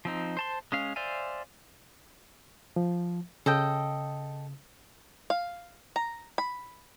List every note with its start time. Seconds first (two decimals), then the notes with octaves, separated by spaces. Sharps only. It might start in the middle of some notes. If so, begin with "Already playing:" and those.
0.05 F3 C4 D#4
0.37 C5 A5 C6
0.72 G#3 C#4 F5
0.96 C5 D5 E5 F5 G#5
2.76 F3
3.46 C#3 A4 D#5 G5
5.30 F5
5.96 A#5
6.38 B5